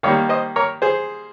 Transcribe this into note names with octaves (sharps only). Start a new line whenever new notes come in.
D#3 G3 A#3 C#5 F5
C5 D#5
A#4 C#5
G#4 C5